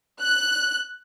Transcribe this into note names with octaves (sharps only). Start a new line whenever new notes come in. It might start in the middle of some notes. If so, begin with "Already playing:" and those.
F#6